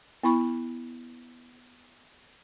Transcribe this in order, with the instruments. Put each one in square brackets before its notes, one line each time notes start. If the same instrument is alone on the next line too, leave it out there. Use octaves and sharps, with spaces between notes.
[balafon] B3 E4 B5 C#6